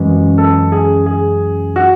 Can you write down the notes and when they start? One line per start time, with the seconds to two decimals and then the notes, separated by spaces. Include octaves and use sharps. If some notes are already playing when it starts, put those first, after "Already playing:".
Already playing: F#2 E3 G#3 C#4
0.38 A4
0.72 G#4
1.06 G#4
1.76 F#4